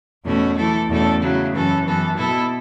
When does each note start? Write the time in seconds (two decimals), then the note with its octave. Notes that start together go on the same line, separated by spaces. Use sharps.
0.24 E2 B2 A3 C#4 F#4
0.56 E3 A3 E4 A4
0.88 E2 B2 A3 C#4 A4
1.20 C#3 F#3 A3 E4
1.52 F#2 E3 C#4 A4
1.84 F#2 E3 B3 A4
2.16 B2 B3 E4 A4